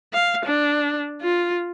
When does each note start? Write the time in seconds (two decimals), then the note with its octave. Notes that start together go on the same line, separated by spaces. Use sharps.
0.13 F5
0.46 D4
1.21 F4